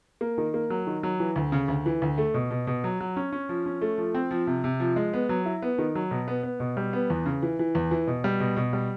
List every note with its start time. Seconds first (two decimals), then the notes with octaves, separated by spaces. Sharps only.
0.21 A#3
0.38 D#3
0.54 A#3
0.70 F#3
0.87 D#3
1.03 F#3
1.20 E3
1.36 D2
1.52 C#3
1.68 D2
1.86 E3
2.02 D2
2.18 A3
2.34 B2
2.51 B2
2.67 B2
2.84 F#3
3.00 F#3
3.16 C#4
3.32 C#4
3.49 F3
3.66 C#4
3.81 A3
3.98 F3
4.14 C4
4.31 F3
4.47 C3
4.64 C3
4.80 F3
4.96 G#3
5.13 B3
5.29 F#3
5.46 E4
5.62 B3
5.78 D#3
5.95 F#3
6.11 B2
6.28 B3
6.43 B3
6.60 B2
6.77 G3
6.93 B3
7.10 E2
7.26 C#3
7.42 E3
7.59 E3
7.75 E2
7.91 E3
8.07 B2
8.24 G3
8.40 B2
8.57 B2
8.73 G3